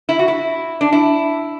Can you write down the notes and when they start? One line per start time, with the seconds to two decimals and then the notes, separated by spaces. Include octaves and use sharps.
0.09 E4
0.19 F#4
0.28 E4
0.81 D4
0.92 E4